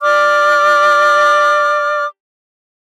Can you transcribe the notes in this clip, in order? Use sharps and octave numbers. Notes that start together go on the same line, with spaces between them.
D5 D6 F6